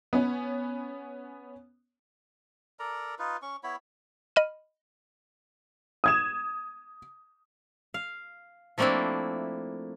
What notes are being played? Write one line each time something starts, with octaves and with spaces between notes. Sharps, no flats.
B3 C#4
A4 A#4 D5 A#5
D#4 F4 B4
C#4 C#6
B3 E4 C#5 B5
D#5 B5 F6 D#7
D#6 G#6 E7
F5
F3 A3 A#3 C4 D4 E4